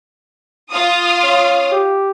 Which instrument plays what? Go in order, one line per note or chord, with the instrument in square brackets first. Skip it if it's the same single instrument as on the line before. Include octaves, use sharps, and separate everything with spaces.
[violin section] F4 F5 D#6
[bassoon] C#4
G4